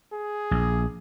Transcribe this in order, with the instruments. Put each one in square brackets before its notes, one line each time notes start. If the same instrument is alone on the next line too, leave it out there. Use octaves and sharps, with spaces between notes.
[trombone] G#4
[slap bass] A#1